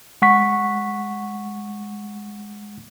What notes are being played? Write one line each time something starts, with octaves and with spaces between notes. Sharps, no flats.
G#3 F#5 C#6 B6